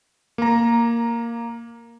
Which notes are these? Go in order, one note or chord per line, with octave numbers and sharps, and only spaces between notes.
A#3 A#5